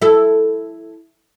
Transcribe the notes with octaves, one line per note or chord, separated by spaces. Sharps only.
E4 A4